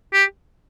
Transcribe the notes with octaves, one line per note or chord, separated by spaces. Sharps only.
G4